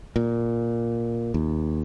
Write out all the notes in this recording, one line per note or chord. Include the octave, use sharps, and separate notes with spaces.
A#2
D#2